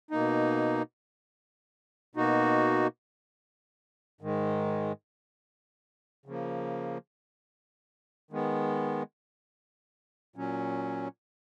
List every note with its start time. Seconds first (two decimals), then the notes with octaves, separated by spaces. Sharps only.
0.11 B2 A#3 D#4
2.15 B2 A#3 D#4 F#4
4.21 G#2 D#3 G#3
6.26 C#3 F3 A#3
8.31 D#3 G#3 B3
10.36 A#2 F#3 C#4